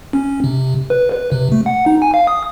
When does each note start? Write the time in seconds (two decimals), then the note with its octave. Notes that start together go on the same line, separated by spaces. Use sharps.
0.13 C#4
0.44 C3
0.90 B4
1.12 B4
1.32 C3
1.52 A3
1.66 F#5
1.86 D#4
2.02 G#5
2.14 F5
2.27 D#6